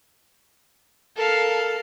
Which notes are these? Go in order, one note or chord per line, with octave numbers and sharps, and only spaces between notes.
A4 A#4 F5